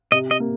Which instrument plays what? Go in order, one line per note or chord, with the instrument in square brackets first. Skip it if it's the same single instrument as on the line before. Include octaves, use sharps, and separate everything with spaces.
[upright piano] C3 [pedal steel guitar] D#5
[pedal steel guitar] D#5
[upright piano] A#3